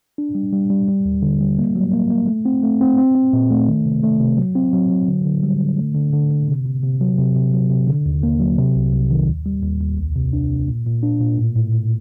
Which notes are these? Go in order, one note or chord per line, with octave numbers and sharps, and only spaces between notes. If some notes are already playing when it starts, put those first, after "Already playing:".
D4
G3
G3
G3
G3
D#2
D3
G3
A#3
F#3
A#3
A#3
A3
C4
A3
C4
C4
C4
A#2
A3
D#3
C3
A3
C3
F#3
C4
F#3
F#3
D3
D3
G3
D3
A3
D3
D3
D3
C3
C3
C3
F#3
C3
C3
F#3
C3
D3
D#2
A#3
F#3
C3
C2
C2
D#3
D#2
G3
D#2
D#2
C2
C3
D4
C3
A#2
A#2
D4
A#2
A2
A2
A2